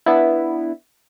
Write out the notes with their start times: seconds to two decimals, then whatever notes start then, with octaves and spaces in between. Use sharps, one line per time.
0.06 B3 D4 E4